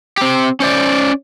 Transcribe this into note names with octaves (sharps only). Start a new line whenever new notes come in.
C4 G4
C#4 C5 D5